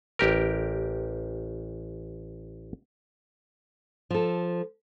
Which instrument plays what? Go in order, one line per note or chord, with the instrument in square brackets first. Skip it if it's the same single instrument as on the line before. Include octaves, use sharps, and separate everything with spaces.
[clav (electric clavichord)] A1 G4 A#4
[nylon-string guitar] F3 A4